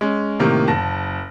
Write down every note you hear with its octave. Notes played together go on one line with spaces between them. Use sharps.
G#3 C#4
A2 C3 D#3 A#3
F#1 A5 A#6